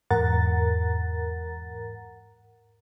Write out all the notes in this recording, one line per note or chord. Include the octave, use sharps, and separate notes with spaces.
E2 G#2 A#4 F#5 A#5 A6